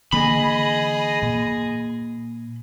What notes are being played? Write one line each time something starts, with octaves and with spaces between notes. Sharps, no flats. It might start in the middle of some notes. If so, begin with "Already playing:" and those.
D3 E3 A#3 G#4 D#5 B5
A#2